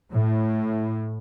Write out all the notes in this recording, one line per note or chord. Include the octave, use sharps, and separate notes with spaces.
A2